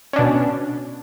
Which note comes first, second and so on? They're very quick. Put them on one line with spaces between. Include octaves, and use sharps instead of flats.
C#4 D4 B2